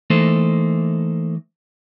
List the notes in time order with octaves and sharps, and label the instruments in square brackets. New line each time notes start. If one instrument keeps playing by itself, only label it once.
[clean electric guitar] E3 A3 A#3 D#4 A4 C5